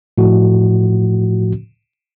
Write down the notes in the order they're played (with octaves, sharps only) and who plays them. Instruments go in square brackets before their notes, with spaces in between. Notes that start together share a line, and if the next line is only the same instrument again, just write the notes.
[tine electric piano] A2 F3 F#4